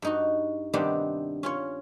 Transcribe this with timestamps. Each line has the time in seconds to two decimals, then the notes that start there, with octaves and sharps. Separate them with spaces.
0.02 G2 D#4 F#4
0.73 C3 D#3 G3 B3 C4 D4
1.43 C#4 F4 C#5